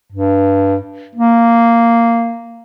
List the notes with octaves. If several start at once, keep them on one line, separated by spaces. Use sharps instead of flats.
G2
A#3